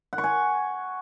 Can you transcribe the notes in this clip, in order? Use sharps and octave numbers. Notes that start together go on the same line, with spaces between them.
F#5
C#6
G#5